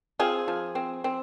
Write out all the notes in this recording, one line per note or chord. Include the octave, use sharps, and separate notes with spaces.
C4 F4 G#4
F3
C4
C4